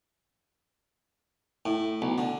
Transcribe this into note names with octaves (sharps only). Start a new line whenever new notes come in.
A2
B1
D3